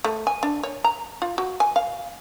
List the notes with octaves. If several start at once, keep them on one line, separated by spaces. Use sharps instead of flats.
A3
G#5
D4
C#5
A#5
F4
F#4
G#5
F5